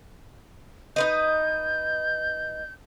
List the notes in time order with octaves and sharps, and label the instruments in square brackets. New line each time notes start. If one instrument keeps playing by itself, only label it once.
[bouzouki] D#4 B4 D#5 [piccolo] G6